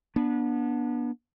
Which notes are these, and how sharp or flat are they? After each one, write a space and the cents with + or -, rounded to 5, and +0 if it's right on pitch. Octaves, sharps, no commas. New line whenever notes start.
B3 -30 D4 +0